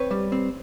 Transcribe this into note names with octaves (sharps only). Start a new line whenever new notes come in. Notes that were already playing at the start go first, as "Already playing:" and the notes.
Already playing: C4 B4 C#5
G3
C4